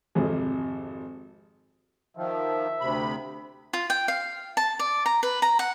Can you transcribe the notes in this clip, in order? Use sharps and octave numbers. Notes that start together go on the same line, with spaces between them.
G#1 F2 C3 G#4
D#3 F3 E5
D2 C3 B5
F4
G5
F5
A5
D5
A#5
B4
A#5
F#5